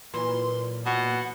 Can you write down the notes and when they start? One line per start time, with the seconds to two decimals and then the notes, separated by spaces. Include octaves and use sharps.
0.14 A#2 E3 F#3 B4 C6
0.86 B2 F#5